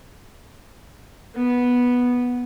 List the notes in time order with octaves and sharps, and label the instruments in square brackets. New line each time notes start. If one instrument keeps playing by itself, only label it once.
[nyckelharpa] B3